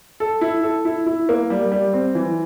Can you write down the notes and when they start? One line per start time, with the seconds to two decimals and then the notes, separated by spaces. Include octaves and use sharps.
0.20 A4
0.41 E4
0.63 A4
0.85 E4
1.06 E4
1.29 A#3
1.50 G3
1.72 G3
1.93 C4
2.15 E3